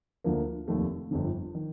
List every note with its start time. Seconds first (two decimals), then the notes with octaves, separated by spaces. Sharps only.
0.24 D2 D3 F3 A#3
0.68 F1 D#2 D#3 A3
1.11 G1 F2 D3
1.55 D#3